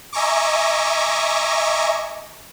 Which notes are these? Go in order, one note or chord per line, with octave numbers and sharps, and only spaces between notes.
D#5 E5 G#5 A#5 C#6 D6